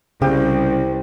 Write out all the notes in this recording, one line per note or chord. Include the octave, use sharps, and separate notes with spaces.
C2 C#3 G4 C5